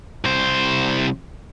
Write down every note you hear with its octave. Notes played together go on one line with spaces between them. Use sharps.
C2 C5